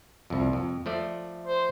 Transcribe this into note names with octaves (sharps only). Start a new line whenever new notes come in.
C2 F2
F2
F3 A3 D5
C5